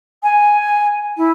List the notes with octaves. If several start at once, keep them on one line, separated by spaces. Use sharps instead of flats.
G#5
E4